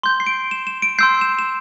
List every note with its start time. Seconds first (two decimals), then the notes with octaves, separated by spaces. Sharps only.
0.03 C6 G6 G7
0.20 C7
0.27 D7
0.51 E7
0.67 E7
0.82 D7
0.99 C6 E6 G6 C7
1.21 E7
1.39 E7